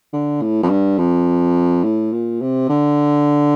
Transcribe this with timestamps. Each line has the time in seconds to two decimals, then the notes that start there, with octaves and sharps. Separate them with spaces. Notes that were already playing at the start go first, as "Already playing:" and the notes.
0.13 D3
0.41 A2
0.63 F2
0.70 G2
0.98 F2
1.84 A2
2.12 A#2
2.41 C3
2.69 D3